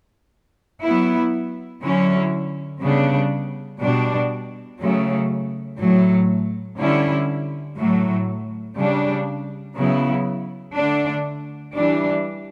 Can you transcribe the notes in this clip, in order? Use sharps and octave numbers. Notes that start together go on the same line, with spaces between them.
F#3 B3 E4
D3 F#3 C#4 E4
C#3 G3 B3 D4
B2 G3 D4
C#3 F#3 A3
A2 F#3 A3
D3 G3 C#4 E4
A2 F#3 A3
C#3 G3 D4
C#3 F#3 B3 E4
D3 A3 D4
E3 G3 D4